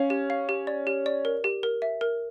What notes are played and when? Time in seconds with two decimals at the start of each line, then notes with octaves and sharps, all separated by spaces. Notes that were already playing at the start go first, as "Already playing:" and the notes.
Already playing: C#4 F5
0.10 G4
0.30 F5
0.49 G4
0.67 D5
0.87 G4
1.06 D5
1.25 A#4
1.44 G4
1.63 A#4
1.82 E5
2.01 A#4